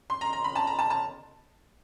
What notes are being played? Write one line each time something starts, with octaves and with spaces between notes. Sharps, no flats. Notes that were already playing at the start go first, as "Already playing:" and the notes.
C6
A#5
A#5
B5
A5
A#5
A5
A5